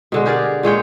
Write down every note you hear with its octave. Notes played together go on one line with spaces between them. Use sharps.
B2 D3 G#3
G4 G#4 A#4 D5
A#2 G#3 C#5 G5